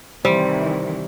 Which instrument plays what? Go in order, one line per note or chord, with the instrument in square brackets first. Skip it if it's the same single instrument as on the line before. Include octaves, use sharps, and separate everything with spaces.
[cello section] C3 D#3 E3 [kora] G3 [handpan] C5